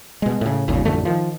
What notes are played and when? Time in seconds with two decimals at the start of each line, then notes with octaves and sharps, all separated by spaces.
0.22 B2 G#3
0.41 A2 C#3
0.68 G1 D#2 A#2 C#3
0.85 A1 F2 D3 A3
1.05 D#3 F3